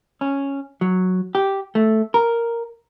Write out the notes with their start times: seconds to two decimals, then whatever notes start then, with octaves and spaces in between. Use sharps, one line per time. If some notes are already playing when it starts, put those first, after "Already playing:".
0.21 C#4
0.81 F#3
1.35 G4
1.75 A3
2.14 A#4